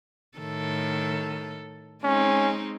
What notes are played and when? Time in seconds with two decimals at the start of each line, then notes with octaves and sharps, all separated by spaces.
0.38 A2 D#3 A4
2.04 G#3 C4 C#4 D#4